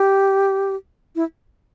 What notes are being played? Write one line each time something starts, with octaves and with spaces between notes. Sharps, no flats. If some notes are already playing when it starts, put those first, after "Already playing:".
Already playing: G4
E4